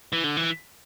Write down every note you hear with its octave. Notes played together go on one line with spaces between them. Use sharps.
E3
D3
E3